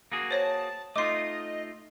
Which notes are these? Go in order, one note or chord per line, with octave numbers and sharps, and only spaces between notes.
A#3 F#4 G#4
C5 C#5 A5 A#6
A3 D#4 F4 D#5 C6 D6